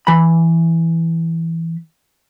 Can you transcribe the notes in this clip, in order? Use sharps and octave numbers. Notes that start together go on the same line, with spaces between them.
E3 B5